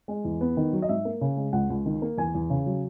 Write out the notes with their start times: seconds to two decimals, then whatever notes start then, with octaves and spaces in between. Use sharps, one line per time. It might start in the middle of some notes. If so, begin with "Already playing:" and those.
0.08 G#3
0.25 E2
0.41 B3
0.57 D#3
0.73 F#3
0.82 D#5
0.89 G#2 E5
1.05 A#3
1.21 C#3
1.37 G#3
1.53 C#2 F#5
1.70 C#2
1.86 D#3
2.02 A#3
2.17 E2 G#5
2.35 E2
2.50 C#3
2.66 F#3